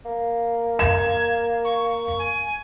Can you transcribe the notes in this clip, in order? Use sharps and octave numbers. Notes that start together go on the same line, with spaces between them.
A#3
G#6 E7
C#6
G#5